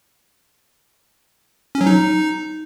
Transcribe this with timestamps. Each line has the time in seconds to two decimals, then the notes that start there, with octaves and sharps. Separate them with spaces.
1.75 C#4
1.81 F#3
1.87 D#4